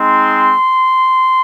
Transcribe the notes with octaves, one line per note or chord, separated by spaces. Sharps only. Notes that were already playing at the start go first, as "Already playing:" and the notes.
Already playing: G#3 C4 D#4 C6